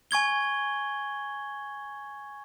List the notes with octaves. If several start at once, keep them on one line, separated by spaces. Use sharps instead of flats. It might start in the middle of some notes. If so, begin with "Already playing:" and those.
G#5 C#6 G#6 G7